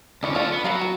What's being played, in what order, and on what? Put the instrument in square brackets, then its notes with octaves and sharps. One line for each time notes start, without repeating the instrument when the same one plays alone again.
[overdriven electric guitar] D2 C#4 [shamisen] D4 E4 B4
[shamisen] D4 F4 [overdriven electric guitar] A4 F5
[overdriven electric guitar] B3
[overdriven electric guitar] F#3 [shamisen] A#4 F5 B5
[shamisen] F#4